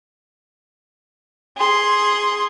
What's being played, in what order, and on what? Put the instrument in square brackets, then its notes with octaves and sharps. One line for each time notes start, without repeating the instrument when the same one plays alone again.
[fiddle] G#4 C6